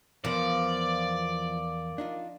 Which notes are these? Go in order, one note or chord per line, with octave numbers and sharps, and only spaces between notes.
E2 F3 B3 F4 A#4 D5 F5
D4 D#4 F4